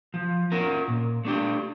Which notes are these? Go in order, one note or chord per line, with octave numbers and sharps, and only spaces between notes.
F3
C#4 F4 A#4
A#2
A3 D4 G4